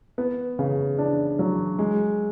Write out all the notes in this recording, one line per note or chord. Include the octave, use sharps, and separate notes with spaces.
B3
C#3
D4
F#3
G#3